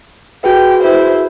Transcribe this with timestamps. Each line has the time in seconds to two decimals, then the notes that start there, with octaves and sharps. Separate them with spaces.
0.44 F#4 G#4 B4 G5
0.82 E4 C5